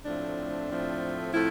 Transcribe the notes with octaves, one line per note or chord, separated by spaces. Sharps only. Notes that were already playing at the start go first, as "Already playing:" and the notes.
A2 F3 A3 C4 D4
A2 F3 A3 C4
A2 F3 A3 C4 E4